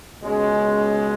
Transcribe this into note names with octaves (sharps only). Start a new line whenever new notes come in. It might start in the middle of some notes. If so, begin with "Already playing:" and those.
C#2 B2 G#3 C#4